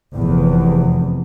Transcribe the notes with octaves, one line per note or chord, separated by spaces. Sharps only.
F1 E2